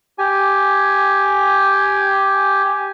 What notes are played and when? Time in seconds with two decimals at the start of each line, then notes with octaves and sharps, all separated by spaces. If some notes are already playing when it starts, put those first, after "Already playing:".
0.18 G4 G#5